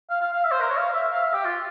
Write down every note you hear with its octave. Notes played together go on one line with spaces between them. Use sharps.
F5
F5
F5
E5
C5
A#4
C#5
F5
E5
F5
E5
G4
F4